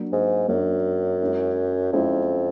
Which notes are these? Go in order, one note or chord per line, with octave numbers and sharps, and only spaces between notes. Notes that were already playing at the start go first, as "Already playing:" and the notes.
Already playing: F#3 A#3 D4
G#2
F#2 F#3 A#3 D4
G#3 C#4 E4
F2 G#3 C#4 E4